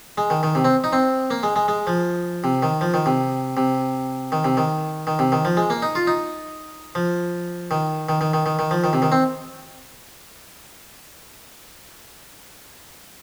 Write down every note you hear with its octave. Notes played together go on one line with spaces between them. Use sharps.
G#3
D#3
D#3
C3
C4
D#4
C4
A#3
G#3
G#3
G#3
F3
C3
D#3
F3
D#3
C3
C3
D#3
C3
D#3
D#3
C3
D#3
F3
G#3
A#3
D#4
F4
D#4
F3
D#3
D#3
D#3
D#3
D#3
D#3
F3
D#3
C3
D#3
C4